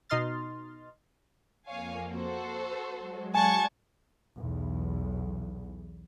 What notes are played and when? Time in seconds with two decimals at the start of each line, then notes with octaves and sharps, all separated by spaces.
0.09 B2 D#4 D#5 C6 F6 A6
1.67 F2 A#3 C#5 F5 G#5
2.11 F#4 A4 C5
2.45 E6
2.99 F#3 G#3
3.35 D5 F#5 G#5 A5 C#6 G#6
4.37 B1 E2